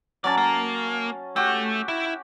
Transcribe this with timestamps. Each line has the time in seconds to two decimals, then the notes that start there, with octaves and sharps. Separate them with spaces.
0.24 F#3 C#4 D5 A5
0.38 A#3
1.36 A3 F#4 G4
1.88 E4